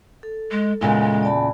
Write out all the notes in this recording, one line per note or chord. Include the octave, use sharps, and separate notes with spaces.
A4
G#3
E2 A#2 C#3 G#3
D5 A5 B5